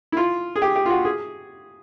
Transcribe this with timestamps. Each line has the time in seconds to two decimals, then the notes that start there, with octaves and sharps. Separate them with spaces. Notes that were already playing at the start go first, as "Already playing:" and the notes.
0.12 E4
0.17 F4
0.56 G#4
0.62 G4
0.75 G4
0.86 F4
0.90 F#4
1.05 G#4